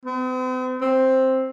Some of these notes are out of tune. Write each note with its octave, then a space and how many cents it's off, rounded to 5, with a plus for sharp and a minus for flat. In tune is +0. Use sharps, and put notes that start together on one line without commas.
C4 -45
C4 +5